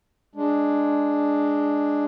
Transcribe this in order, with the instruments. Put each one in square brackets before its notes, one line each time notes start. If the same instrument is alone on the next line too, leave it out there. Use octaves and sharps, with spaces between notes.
[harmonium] G#3 D4